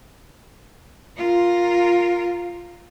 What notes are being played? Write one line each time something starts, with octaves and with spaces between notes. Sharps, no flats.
F4 A#4